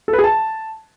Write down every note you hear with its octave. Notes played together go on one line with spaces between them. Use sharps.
A4
B4
G#4
A5